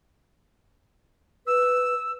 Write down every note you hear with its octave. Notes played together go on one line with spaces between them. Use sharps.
B4 E6